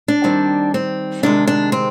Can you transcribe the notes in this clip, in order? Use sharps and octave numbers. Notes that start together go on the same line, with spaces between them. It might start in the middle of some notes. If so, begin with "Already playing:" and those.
D4
D#3 G3 C4
C4
C3 D#3 G#3 D4
D4
C4